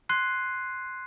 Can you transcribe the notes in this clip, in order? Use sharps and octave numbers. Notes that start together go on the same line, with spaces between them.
C6 F#6 G#6 C7 D#7